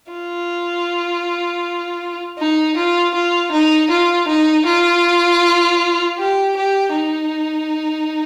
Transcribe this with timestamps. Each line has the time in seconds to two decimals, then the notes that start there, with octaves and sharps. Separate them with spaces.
0.12 F4
2.39 D#4
2.77 F4
3.15 F4
3.52 D#4
3.90 F4
4.28 D#4
4.67 F4
6.19 G4
6.57 G4
6.94 D#4